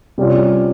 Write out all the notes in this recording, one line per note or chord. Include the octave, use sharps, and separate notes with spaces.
C3 G3 C#4 F4